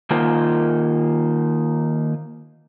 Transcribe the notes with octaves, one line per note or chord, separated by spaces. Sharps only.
D#3 A#3 D#4 F4 C5